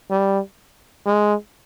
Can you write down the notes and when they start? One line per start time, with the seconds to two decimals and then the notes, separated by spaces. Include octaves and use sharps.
0.11 G3
1.06 G#3